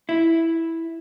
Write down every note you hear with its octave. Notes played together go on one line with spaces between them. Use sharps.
E4